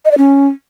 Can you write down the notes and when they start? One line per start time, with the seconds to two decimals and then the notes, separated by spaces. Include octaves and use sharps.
0.05 D#5
0.11 D5
0.18 C#4